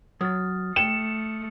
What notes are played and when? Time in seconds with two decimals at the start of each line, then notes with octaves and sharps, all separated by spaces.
0.21 F#3 D#6 F6 A6
0.76 A3 G5 C#7 E7